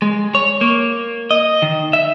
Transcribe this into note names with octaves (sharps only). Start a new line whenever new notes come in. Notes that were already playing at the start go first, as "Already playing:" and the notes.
G#3
C#5
A#3
D#5
D#3
E5